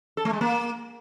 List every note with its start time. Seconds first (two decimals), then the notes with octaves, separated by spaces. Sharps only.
0.17 A4
0.25 A3
0.33 G#3
0.41 A#3